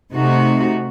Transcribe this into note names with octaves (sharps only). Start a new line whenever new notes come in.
C3 A3 D#4 F#4